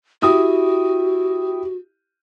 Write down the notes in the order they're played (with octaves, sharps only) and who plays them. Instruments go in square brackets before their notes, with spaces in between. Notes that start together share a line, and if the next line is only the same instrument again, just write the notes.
[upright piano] E4 G4 D#6 [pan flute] F#4